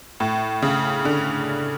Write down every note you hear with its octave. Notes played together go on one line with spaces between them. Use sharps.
A2
C#3
D3